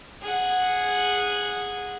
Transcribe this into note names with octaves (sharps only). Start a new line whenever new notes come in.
G#4 F#5